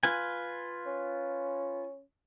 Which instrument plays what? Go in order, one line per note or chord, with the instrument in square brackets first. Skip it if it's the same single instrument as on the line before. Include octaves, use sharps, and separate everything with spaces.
[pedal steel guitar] F4 B4 G#5
[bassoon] C#4